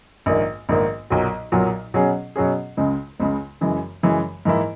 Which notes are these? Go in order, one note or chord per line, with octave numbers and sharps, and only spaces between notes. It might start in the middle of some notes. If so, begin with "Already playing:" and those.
A#1 G#2 D#3 A#3
A#1 G#2 D#3 A#3
B1 A#2 F#3
B1 A#2 F#3
B2 F#3 C#4 G#4
B2 F#3 C#4 G#4
C#2 C#3 G#3
C#2 C#3 G#3
F#2 C#3 E3 G#3
F#2 C#3 E3 G#3
G#2 E3 A#3 E4